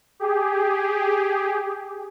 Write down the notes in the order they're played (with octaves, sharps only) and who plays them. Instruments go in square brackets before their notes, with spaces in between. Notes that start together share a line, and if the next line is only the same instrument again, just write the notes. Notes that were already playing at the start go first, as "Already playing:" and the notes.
[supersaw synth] G4 G#4